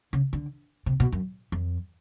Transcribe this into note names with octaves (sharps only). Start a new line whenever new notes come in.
C#3
D3
C3
B2
F#2
F2